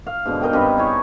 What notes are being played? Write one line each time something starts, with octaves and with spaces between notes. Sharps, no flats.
F5
G#2 B2 D3
D#4 A#4 D#5 G5
G2 C4 B4
D#4 E4 G#4 C#5